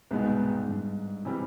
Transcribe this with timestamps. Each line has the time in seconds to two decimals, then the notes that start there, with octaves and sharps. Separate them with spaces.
0.11 C2 G#2 B2 G#3 B3 D#4
0.67 G2
1.25 C3 E3 G3 C4